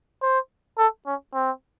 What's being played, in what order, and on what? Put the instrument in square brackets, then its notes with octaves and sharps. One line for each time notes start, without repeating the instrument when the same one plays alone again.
[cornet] C5
A4
C#4
C4